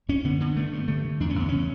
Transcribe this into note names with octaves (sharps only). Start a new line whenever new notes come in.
F#2 C#4
D3 B3
D3 B3
G2 A3
G2
D3 A3
D3
E2 D4
C#4
E2 B3
C#3 C#4